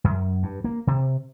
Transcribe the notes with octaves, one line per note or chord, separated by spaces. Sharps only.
F#2
G2
A#3
C3